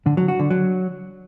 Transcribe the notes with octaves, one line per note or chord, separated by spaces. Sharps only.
D3
F#3
F#4
D3
F#3